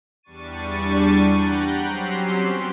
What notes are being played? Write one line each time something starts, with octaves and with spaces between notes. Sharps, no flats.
E2 G3 D4 C#6 A6 D#7
F#5 G5 A#5 B5 F#6 G6
F#3 C4 C#4 G4 C6 C7
B3 B6